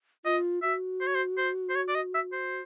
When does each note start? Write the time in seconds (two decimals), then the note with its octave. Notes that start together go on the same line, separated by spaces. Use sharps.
0.25 F4 D#5
0.62 F#4 E5
1.01 C5
1.07 C#5
1.15 C5
1.38 C5
1.70 C5
1.75 C#5
1.88 D5
1.95 D#5
2.14 E5
2.32 C5